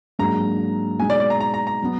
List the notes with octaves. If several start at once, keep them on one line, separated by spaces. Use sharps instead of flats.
G#2 F#3 A#3 D4 G#4 A#5
B2 G#3 D#4 G#5
D5
D5
A#5
A#5
A#5
A#5
F#3 B3